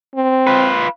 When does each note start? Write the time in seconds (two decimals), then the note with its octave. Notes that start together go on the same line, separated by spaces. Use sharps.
0.15 C4
0.47 F4 B4